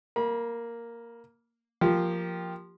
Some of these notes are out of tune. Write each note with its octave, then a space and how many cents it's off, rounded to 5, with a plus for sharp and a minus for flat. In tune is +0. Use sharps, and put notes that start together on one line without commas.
A#3 +0 B5 -40
F3 +0 A#3 +0 G4 +5